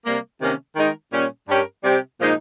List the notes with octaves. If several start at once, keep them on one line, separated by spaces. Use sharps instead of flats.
C3 G3 A#3
C3 D#3 A#3 C#4
D#3 G#3 D#4 A#4
A#2 G3 C#4
G2 G3 C#4 G4 A#4
C3 G3 C4 G4
A#2 F3 G#3 D#4